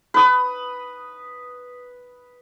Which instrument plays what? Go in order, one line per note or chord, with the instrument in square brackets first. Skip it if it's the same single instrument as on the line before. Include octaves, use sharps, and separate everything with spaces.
[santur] B4 D#6